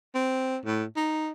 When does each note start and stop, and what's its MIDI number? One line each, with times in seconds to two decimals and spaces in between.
0.15 0.58 60
0.66 0.84 45
0.97 1.31 63